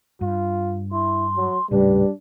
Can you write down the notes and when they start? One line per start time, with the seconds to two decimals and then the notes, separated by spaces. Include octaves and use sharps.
0.21 G2 F4
0.92 E4 C6
1.36 F#3
1.71 D#1 A2 C#3 G3 D4 B4